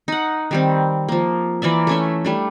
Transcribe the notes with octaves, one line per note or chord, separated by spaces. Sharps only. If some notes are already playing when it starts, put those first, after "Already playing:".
D#4 F#5
D#3 G3 C4
F3 A#3
E3 A#3 D5 E5
A3 C#4 E5
G3 A3 D4